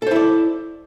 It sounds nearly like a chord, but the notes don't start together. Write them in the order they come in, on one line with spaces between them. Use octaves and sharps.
A4 C5 E4 D5